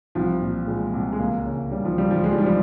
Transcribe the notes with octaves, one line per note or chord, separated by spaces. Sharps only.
C2 F3
A#2
A#2 G#3
C2
G#3
C#2 A#3
C#3
C#3 G3
F3
C#2 G3
F3
D#3 G#3
G3
F3
G3